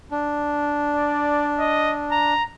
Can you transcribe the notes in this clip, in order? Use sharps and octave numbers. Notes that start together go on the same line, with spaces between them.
D4
D5
D#5
A#5